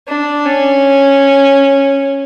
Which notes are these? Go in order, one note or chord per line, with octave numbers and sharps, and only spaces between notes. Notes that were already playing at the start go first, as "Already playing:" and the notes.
D4
C#4